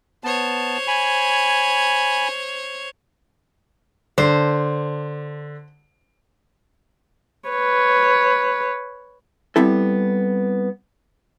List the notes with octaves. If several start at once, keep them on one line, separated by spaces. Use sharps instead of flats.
B3 C5 C#5 A5
G#5 B5
D3 C5
B4 C#5
G3 B3 C4 E4 A4